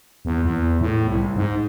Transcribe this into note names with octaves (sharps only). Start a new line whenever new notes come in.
E2
E2
A2
C2
G#2